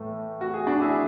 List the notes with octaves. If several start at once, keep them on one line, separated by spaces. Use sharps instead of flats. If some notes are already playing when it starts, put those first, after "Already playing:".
Already playing: A2 E3 A3
F#4
G#4
D4 F#4
E4 G#4